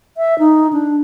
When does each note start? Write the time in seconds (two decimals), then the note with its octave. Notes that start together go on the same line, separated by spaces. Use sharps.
0.17 E5
0.39 D#4
0.73 D4